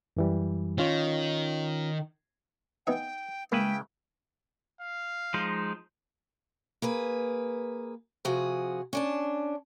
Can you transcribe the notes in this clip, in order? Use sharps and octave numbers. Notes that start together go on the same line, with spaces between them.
F#2 E3 G3
D#3 C#4 F4 C#5
B3 D#4 E5 G5 G#5
C#3 G#3 A#3 E4 B4 G5
F5
F3 G#3 D#4
A#3 G#4 B4
C3 F3 F#4 G#4
C#4 D4 A5